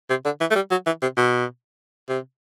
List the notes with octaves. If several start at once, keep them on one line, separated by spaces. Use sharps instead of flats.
C3
D3
E3
A3
G3
F#3
E3
C3
B2
C3